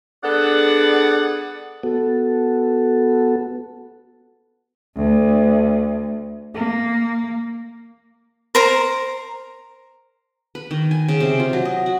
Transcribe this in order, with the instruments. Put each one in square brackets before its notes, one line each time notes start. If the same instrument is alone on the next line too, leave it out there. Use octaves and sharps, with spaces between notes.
[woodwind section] B3 D4 G#4 A4 D5 F#5
[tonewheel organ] B3 F#4 A4
[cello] D2
A#3
[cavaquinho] A#4 C5 A#5
[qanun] B4
D#3
G#5
C#3
C3
F4
F#3
D#5
F#4